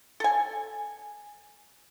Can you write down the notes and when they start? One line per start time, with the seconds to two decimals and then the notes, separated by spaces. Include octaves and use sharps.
0.20 A4 G#5